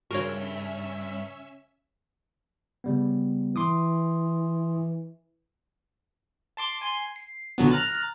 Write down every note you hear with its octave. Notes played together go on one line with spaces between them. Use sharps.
G2 C#3 C#4 F4 F#4 A#4 C#5 E5
C#3 G3 B3
E3 C6 D6 D#6
A5 C6 D6
G#5 C6
C7
A#2 D3 F#3 B3
A#5 F6 F#6 A6